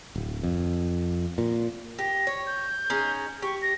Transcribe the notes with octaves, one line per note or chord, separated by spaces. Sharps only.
D1
F2
A#2
G4 A#6
C#5
G6
C#4 D#4 G#4
G4 C#6
A#6